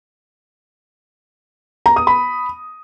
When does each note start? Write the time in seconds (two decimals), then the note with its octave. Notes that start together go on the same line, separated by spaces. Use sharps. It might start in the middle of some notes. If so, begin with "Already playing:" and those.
1.86 A#5
1.96 D#6
2.07 B5